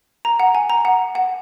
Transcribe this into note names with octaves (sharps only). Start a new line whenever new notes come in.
A#5
F#5
G#5
A#5
F#5
F#5